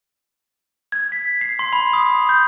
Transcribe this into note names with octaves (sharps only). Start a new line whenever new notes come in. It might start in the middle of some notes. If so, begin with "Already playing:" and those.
G#6
B6
C7
C6
B5
D#6
G6